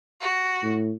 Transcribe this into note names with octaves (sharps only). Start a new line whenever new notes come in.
F#4
A2